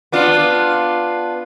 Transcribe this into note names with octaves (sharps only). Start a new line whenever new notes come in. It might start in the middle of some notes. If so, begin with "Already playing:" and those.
B3 D4 F4